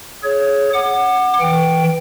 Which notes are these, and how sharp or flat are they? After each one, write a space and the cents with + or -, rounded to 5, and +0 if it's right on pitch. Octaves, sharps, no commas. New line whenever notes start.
G#4 +20 C#5 +0
F#5 +0 D6 +35
E3 +0 G5 +0